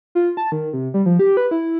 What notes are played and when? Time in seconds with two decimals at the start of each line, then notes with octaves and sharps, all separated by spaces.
0.15 F4
0.37 A5
0.52 D#3
0.73 C3
0.94 G3
1.06 F3
1.19 G4
1.37 B4
1.51 E4